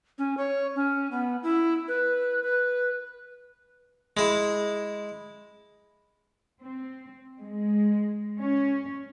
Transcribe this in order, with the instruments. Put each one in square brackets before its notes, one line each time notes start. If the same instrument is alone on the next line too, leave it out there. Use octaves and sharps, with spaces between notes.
[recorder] C#4
C#5
C#4
B3
E4
B4
B4
[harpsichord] G#3 E4
[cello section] C4
G#3
C#4